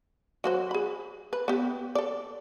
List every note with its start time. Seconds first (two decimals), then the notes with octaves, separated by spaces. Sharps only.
0.44 F#3 F#4 C5
0.71 G#4 B5
1.33 B4
1.48 B3 G4
1.95 A4 D5